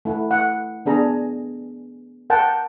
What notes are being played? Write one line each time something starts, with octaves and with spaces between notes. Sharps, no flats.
A3 E4 F#5
F#5
B3 D4 G#4 A#5
A#4 F#5 G5 A5